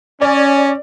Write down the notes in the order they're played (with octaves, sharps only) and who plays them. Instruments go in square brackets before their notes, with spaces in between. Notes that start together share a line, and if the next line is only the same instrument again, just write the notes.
[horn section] C#4 [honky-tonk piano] D5